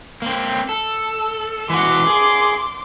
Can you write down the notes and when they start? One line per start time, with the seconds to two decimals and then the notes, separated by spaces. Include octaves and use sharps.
0.22 A#3 C4
0.69 A4
1.70 E3 F#4 C6 D6
2.07 G#4